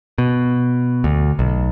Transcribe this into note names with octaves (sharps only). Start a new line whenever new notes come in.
B2
D2
B1